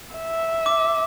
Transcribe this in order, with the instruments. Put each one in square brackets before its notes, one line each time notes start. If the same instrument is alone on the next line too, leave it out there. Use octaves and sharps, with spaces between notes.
[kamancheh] E5
[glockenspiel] D6